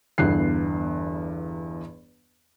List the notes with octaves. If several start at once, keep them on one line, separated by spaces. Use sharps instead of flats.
G1 E2 G2 F#6 C7